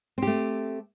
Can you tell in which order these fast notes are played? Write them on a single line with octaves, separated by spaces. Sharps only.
C4 G4 A3